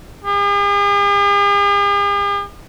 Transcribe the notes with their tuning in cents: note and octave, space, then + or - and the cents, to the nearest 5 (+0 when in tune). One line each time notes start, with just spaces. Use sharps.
G#4 -45